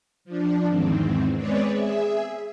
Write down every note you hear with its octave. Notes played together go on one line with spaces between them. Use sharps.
F3 D4
E2 G#2 D#3 C4
G#3 B3 C4 B4 C#5 D5
G#4 E5